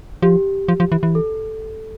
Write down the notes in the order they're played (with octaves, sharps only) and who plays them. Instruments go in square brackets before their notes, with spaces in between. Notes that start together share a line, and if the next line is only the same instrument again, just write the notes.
[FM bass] F3 [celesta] G4
[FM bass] F3
F3
E3
E3
[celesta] A4